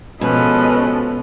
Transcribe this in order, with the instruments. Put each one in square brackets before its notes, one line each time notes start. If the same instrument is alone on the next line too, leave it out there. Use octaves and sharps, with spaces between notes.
[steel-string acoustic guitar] B2 [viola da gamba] F3 G#3 A4 [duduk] C#4 [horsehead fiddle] B4 D#5